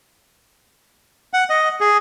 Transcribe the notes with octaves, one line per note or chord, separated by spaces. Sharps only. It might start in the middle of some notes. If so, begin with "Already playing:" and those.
F#5
D#5
G#4